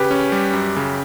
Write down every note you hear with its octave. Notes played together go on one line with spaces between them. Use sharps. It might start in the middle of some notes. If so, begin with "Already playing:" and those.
Already playing: C#3 G4 B4
C#4
G3
F#2
C#3